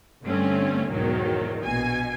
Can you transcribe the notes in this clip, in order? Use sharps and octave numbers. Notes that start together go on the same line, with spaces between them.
G2 D3 A3 C4 C#4
B1 E2 G#2 D#3 F#3
A#1 B2 G#5